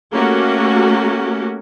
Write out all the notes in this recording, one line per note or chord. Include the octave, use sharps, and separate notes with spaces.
A3 A#3 C#4 F#4 G4 A#4